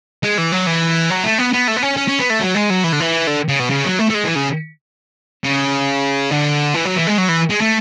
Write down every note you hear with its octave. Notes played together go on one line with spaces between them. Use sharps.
G#3
E3
F#3
E3
F#3
A3
B3
B3
A3
B3
C#4
C#4
C#4
B3
A3
F#3
G#3
F#3
E3
D3
E3
D3
C#3
B2
C#3
F#3
A3
A3
G#3
E3
C#3
C#3
D3
E3
F#3
E3
G#3
F#3
E3
G#3
A3